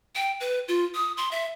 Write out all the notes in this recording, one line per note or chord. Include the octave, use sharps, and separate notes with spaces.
G5
B4
F4
D#6
C6
E5